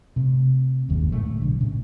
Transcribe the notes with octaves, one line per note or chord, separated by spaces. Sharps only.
C3 A3
F#1 D#2 G#2 C#3
A2 C#3 G#3 A3
B1 D3
A2 C#3